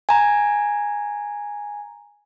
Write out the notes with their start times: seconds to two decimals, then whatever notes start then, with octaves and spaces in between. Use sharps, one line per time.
0.09 G#5 A#5